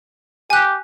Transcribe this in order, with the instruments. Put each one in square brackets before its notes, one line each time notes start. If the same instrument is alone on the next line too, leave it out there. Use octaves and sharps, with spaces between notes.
[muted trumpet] G4 [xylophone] G#5 F#6